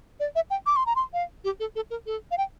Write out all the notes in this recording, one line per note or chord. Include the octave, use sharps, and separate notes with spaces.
D5
E5
G5
D6
C6
A#5
C6
F5
G4
A4
A4
A#4
A4
F5
G5